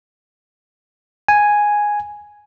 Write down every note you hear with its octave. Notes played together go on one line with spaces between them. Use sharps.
G#5